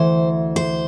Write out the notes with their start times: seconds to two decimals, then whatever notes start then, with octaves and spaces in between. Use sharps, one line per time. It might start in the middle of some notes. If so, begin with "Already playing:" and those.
Already playing: D2 E3 C5
0.56 C5